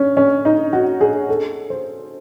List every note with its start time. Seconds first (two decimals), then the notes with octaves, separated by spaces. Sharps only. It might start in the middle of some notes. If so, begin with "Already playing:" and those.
Already playing: C#4
0.17 C#4
0.45 D#4
0.73 F#4
1.01 G#4
1.29 A4
1.70 C5